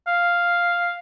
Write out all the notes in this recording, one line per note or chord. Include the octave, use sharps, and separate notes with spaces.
F5